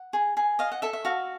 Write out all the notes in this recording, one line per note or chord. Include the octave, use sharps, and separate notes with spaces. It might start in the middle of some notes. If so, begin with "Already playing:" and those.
Already playing: F#5
G#4
G#4
D#5 F5
F#5
A4 E5
E5
F#4 F5